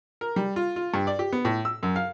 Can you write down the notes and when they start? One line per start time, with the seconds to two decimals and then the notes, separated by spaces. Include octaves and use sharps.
0.21 A#4
0.36 G3
0.56 F4
0.76 F4
0.94 G2
1.07 D5
1.19 G4
1.33 B3
1.45 A2
1.65 E6
1.83 F#2
1.96 F5